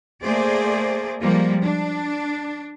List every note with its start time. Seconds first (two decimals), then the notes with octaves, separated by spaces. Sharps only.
0.22 A3 A#3 G#4 C5 D5
1.21 F3 G3 G#3 A#3
1.63 D4